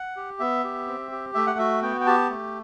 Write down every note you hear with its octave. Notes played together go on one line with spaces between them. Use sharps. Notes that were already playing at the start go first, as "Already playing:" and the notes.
Already playing: F#5
G4
B3 E5
G4
C4
G4
A3 E5
F#5
F#4 E5
B3 G5
G5
G4 A5
A3